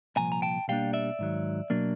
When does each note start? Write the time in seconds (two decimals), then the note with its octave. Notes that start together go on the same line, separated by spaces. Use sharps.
0.16 C2 A#2 F3 G#5 A#5
0.32 A#5
0.42 G5 A5
0.68 B2 G3 A#3 D4 F5 G5
0.93 D5 E5
1.19 G#2 D#3 F#3
1.70 B2 F#3 A#3 D4